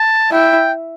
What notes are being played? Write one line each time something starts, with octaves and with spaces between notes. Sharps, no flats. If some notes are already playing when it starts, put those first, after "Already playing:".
Already playing: A5
E4 G5